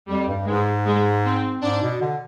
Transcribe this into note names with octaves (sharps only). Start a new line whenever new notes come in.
F2 G3
G2
G#2 G#3
G#3
C4
G#2 D4
B2
D3